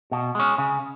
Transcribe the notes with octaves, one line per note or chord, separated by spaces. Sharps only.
B2
G#3 C#4
C#3